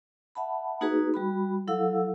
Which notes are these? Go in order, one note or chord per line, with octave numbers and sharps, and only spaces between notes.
E5 F#5 A5 B5
A#3 D#4 F#4 G#4 B4
G3 F#4 B5
F#3 E4 A4 F5 F#5 E6